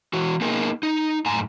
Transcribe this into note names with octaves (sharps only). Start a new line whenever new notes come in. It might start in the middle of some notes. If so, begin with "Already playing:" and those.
E3 F#4
A#3 B3 D#4 G#4 A#4
D#4
F#2 A2 G#5 A#5